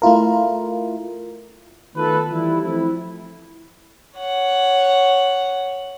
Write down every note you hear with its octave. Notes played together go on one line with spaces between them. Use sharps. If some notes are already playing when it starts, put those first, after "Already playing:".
A3 E4 F4 A#4
D#3 A3 B3 F4 A4 B4
E3 F3 G3 E4
F3 A3 C4 E4
C#5 F#5